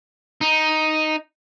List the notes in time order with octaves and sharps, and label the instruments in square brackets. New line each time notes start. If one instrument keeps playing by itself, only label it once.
[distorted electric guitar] D#4